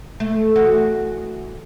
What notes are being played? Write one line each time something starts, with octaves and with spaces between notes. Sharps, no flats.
A3
E2 F#4